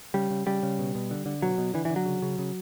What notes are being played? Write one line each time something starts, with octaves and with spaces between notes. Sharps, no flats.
C#3 G3
C#3
C#3 G3
C#3
B2
B2
D3
D3
B2 F#3
B2
D3 E3
E3
D3
F#3
C#3
C#3
C#3